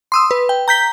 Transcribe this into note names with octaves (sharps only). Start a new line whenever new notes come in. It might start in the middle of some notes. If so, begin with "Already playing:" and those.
C6 D#6 E6
B4
G5
A#5 G6 B6 G7